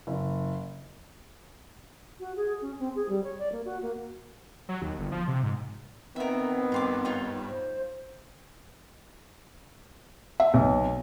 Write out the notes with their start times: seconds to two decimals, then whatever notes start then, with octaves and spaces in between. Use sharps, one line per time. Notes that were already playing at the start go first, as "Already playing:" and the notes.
0.07 F#1
2.20 F#4
2.36 G#4
2.62 C#4
2.79 C4
2.95 G#4
3.08 G3
3.23 C#5
3.38 D5
3.52 A#3
3.65 F#4
3.82 A#3
4.69 F#3
4.82 D#2
4.98 G1
5.12 F3
5.28 C3
5.43 G#2
6.16 D#3 B3 C4 A#4 E5
6.72 G2 F4 C6 D6
7.05 D#4 F4 C#5
7.47 C5
10.40 E5
10.54 B1